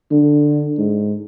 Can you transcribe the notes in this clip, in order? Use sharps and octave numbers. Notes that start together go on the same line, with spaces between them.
D3
G#2